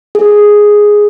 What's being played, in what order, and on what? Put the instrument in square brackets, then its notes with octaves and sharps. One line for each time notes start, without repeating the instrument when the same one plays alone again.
[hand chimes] G#4